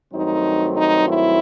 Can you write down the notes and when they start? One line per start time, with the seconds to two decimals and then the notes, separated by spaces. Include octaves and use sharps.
0.13 G2 D#3 F#3 A3 C4 D#4
0.76 D#4
1.08 E4